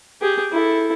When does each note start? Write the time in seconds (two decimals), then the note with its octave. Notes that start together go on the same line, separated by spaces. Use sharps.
0.21 G4 G#4
0.52 E4 A4